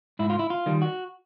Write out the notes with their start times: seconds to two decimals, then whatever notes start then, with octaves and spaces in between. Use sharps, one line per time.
0.19 G#2 E4
0.30 F4
0.39 E4
0.50 F4
0.66 D#3 G3
0.82 F#4